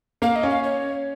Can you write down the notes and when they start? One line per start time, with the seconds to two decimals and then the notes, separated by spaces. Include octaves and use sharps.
0.22 A#3 F5
0.36 D#5
0.43 C#4
0.50 F5
0.64 C#5